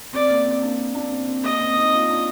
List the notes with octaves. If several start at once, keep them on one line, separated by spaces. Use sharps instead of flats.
C4 D5
A#3
C4
A#3 D4
A#3 D4
C4
C4
A#3 D#5
C4
C4 D#4
D4 F4
D4 F4